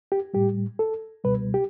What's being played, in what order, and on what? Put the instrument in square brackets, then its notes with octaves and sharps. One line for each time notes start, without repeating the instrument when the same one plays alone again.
[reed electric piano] G4
A2 G3 G4
A4
C#2 B2 G3 B4
G4